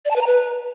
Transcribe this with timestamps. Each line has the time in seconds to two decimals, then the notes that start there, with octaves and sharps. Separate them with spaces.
0.05 D5
0.10 A5
0.16 B4
0.21 A#5
0.27 B4